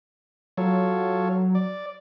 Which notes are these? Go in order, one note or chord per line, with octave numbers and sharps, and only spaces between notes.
F#3 F4 A4 C#5
D5